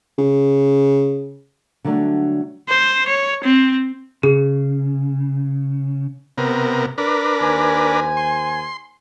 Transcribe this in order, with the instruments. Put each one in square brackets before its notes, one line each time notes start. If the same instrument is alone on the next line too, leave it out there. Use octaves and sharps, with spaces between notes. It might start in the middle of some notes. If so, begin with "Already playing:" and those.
[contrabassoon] C#3
[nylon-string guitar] D3 F#3 G3 A3 D4
[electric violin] C5
C#5
C4
[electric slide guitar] C#3 [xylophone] G#4
[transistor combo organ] C3 B3 A#4
D4 A#4 B4
[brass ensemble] D#2 C5 G#5
[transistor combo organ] C6